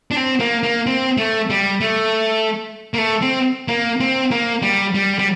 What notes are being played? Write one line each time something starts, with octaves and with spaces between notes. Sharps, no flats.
D4
C4
A#3
A#3
C4
A3
G3
A3
A#3
A3
C4
A#3
C4
A#3
G3
G3
G3